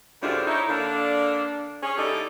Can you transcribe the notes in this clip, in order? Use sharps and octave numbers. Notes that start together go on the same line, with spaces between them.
F#2 A2 C3 G#3 D4 F4
D#4 E4 C#5
D3 A#3 D4
C#4 G#4
D3 A3 D#4 E4 G4 D5